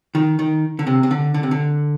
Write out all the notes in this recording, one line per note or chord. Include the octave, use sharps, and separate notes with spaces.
D#3
D#3
D3
C3
C3
D3
D3
C3
D3